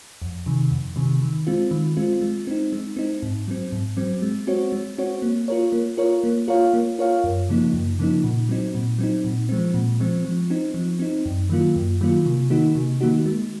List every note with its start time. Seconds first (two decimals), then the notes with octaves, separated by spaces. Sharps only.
0.22 F2
0.46 C3 D#3
0.71 F2
0.96 C3 D#3
1.22 D#3
1.47 G#3 C4 F4
1.71 D#3
1.97 G#3 C4 F4
2.21 G#3
2.47 C4 D#4
2.73 G#3
2.97 C4 D#4
3.22 G#2
3.48 F#3 C4
3.72 G#2
3.97 F#3 C4
4.22 G#3
4.47 C4 F#4 C#5
4.72 G#3
4.98 C4 F#4 C#5
5.22 A#3
5.48 F4 A#4 C#5
5.72 A#3
5.97 F4 A#4 C#5
6.24 A#3
6.48 F4 A#4 C#5 F5
6.73 A#3
6.99 F4 A#4 C#5 F5
7.24 F#2
7.49 C#3 F3 A#3 D#4
7.74 F#2
7.99 C#3 F3 A#3 D#4
8.24 A#2
8.49 F#3 C4 D#4
8.75 A#2
8.99 F#3 C4 D#4
9.24 A#2
9.49 F3 G#3 C4
9.74 A#2
10.00 F3 G#3 C4
10.25 F3
10.50 C4 D#4
10.74 F3
10.99 C4 D#4
11.25 F#2
11.50 D#3 F#3 A#3 F4
11.76 F#2
12.01 D#3 F#3 A#3 F4
12.26 C3
12.50 D#3 A#3 D#4 F#4
12.75 C3
13.01 D#3 A#3 D#4 F#4
13.26 G#3